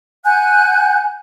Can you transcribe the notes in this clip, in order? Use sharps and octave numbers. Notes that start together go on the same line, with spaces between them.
F#5 G#5 F#6 G6